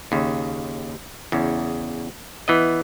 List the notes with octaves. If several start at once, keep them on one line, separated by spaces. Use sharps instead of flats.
D#2 C#3
E2 C#3
E3 B3 D#5